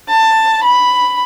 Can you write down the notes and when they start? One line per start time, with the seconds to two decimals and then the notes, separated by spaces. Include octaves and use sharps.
0.09 A5
0.63 B5